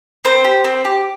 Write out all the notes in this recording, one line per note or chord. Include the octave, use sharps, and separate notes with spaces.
C4 C5
G4
C4
G4